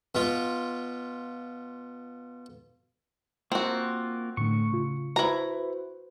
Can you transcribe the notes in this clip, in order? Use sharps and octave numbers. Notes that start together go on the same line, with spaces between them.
B2 F4
A#3 C4 F4 F#4 A#4
A2 D3 A3 C#6
C#3 F4
E4 F#4 B4 C5 A#5